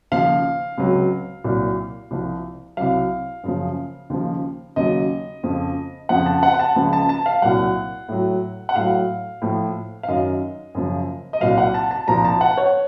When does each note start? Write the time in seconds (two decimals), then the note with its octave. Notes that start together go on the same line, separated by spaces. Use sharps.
0.12 D#2 C#3 F3 F5
0.78 C#2 C3 F#3
1.44 C2 A#2 F#3
2.11 C2 C3 F3
2.77 C2 C3 F#3 F5
3.44 F#2 C#3 F3
4.10 D#2 C#3 F3
4.76 D#2 C#3 F#3 D#5
5.43 F2 C#3 F3
6.09 F2 C#3 F3 F#5
6.26 A5
6.43 F#5
6.54 F#5
6.59 A5
6.76 C#2 C#3 F3
6.93 A5
7.09 A5
7.26 F5
7.42 C2 A#2 F#3 F#5
8.09 A2 F#3
8.69 F#5
8.75 A2 F#3 F5
9.42 A2 F3
10.03 F5
10.08 F#2 D#3 F#3 D#5
10.75 F#2 C#3 F3
11.33 D#5
11.40 C2 A#2 F#3 F5
11.58 F#5
11.74 A5
11.91 A5
12.08 C2 A#2 F3 A#5
12.25 A5
12.41 F#5
12.57 C#5